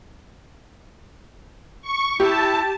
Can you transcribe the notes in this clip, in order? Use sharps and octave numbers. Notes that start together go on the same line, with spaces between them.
C#6
E4 G4 A5